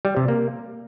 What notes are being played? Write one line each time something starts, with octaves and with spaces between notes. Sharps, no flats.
G3
C3
A#3